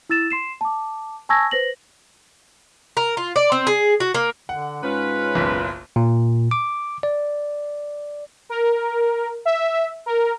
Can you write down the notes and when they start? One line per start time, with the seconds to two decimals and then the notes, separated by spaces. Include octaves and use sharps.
0.09 E4 E6 A6 E7
0.30 C6 C7 E7
0.61 A5 D6
1.29 G#5 A5 C#6 E6 G#6 A#6
1.51 B4 C5 A#6 F#7
2.97 A#4
3.17 F4
3.36 D5
3.52 C4
3.67 G#4
4.00 F#4
4.14 A#3
4.49 D3 F#5
4.83 G#2 G#3 C#4 F4 B4
5.35 F#1 B1
5.96 A#2
6.51 D6
7.03 D5
8.50 A#4
9.45 E5
10.06 A#4